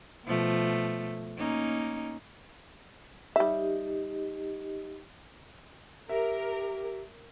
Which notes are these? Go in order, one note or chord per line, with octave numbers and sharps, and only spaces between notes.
B2 F3 A3
A#3 C#4 D#4
G3 D#4 G4 D#5 E5
G4 A#4 E5